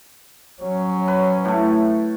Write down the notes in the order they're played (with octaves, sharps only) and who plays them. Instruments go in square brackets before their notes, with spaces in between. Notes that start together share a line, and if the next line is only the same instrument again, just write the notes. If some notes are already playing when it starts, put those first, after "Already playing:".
[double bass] F#3 C#4
[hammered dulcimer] B4
A2 A3